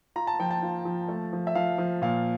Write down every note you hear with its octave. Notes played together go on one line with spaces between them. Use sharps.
F4 A#5
A5
F3 G5
A5
F4
F3
A3
F3
E5
F3 F5
F3
A#2 F5